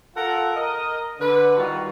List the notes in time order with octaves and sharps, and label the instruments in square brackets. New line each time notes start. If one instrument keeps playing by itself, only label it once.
[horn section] F4 A4 A#4 F#5
A#4 D#5
D3 B4
D#3 G3 F4 F#4